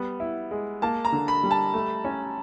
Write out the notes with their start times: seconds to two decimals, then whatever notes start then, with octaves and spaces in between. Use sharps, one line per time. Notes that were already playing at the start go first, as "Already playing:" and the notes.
Already playing: G3 B3
0.20 E4
0.51 G#3
0.82 A#3 A5
1.05 A#5
1.12 D3
1.28 B5
1.43 G3
1.51 A5
1.74 A3
2.04 C#4